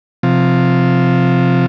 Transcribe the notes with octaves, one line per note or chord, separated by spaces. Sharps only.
C3 F3